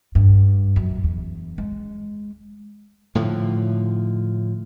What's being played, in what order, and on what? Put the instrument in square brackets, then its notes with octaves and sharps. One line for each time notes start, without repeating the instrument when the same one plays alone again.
[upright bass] G2
F#2
E2
G#3
[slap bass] A2 D3 F3